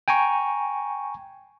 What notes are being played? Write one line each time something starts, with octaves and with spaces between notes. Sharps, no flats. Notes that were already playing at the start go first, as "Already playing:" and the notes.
G5 G#5 A#5 C#6